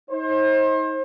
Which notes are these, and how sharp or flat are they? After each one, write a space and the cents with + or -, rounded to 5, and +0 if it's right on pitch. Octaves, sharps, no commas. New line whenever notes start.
D#4 +40 C5 +35